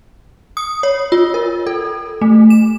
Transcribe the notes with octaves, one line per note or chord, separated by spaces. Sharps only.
D#6
C#5
F4
A#4
A4
A3
E7